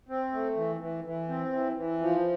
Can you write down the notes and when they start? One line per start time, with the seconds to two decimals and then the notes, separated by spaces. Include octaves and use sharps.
0.09 C4
0.32 A3
0.57 E3
0.81 E3
1.04 E3
1.29 C4
1.53 E3
1.77 E3
2.01 F3